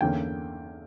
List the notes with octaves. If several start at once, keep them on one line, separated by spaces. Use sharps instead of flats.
E2 D3 A#3 C#4 G5